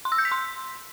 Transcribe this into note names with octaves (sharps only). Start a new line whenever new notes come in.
C6
E6
G6
B6
C6